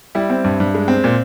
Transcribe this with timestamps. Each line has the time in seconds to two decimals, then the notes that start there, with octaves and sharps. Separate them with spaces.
0.15 G3 E4
0.30 C4
0.44 G2
0.60 G2
0.75 G#3
0.88 C4
1.04 A#2